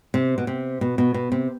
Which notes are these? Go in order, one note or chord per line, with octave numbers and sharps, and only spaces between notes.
C3
B2
C3
B2
B2
B2
C3